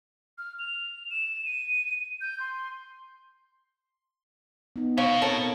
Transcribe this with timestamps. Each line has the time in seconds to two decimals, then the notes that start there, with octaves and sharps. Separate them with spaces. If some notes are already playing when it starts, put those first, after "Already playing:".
0.38 F6
0.59 F7
1.11 E7
1.45 D#7
2.21 G6
2.40 C6
4.76 B3 D#4
4.98 B2 C#5 F5 G5
5.22 C4 A4 A#4 C#5 A5